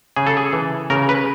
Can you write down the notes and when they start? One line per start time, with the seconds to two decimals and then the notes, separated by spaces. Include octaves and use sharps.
0.16 C#3 G#4
0.27 A4
0.37 G#4
0.53 E3
0.90 C#3 A#4
1.09 B4